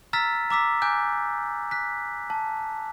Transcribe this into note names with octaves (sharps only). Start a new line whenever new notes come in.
A#5 E6 F6 A6 B6
A#5 D6 E6 B6
G#5 D6 F#6 G6
F#6 B6
A5